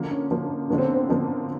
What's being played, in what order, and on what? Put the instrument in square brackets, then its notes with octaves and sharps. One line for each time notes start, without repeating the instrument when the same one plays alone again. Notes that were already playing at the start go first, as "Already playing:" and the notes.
Already playing: [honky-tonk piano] D3 F3 A#3
[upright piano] C#4
[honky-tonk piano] D3 F3 A#3
[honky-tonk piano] D3 F3 A#3 [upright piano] C#4
[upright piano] C4
B3
C4
[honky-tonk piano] D3 F3 A#3